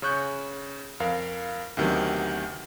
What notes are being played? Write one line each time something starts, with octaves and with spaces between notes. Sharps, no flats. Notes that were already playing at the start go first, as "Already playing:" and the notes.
C#3 C#4 C#6 F#6 G6
F2 A#4 F5
D2 C3 D#3 F#3 B3